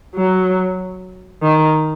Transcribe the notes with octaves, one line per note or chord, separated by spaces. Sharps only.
F#3
D#3